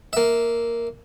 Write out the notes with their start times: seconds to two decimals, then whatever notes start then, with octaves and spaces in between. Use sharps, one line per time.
0.13 A#3 E5